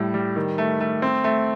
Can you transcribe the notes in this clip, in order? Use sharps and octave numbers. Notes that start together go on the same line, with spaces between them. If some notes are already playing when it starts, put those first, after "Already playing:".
Already playing: A2 G3
G3
D#3
A3
A3
C4
A3